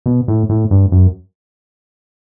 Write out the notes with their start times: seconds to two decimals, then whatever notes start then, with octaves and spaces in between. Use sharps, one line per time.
0.06 B2
0.28 A2
0.49 A2
0.71 G2
0.92 F#2